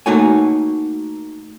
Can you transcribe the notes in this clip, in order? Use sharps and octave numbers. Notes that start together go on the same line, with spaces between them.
A3 A#3 D#4 F#4 C#5 G#5